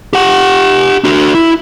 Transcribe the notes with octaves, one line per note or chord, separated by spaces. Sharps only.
G4 F#5
D4 F#4
E4